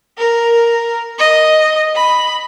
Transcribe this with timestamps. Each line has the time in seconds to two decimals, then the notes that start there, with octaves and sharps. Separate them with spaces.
0.18 A#4
1.19 D#5
1.96 B5